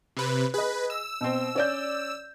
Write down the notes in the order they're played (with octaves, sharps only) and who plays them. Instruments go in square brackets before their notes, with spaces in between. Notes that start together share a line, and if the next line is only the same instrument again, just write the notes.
[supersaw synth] C3 B4
[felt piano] G#4 D#5 [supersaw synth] B4
[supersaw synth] E6
[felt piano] B2 C4
C#4 D5 G6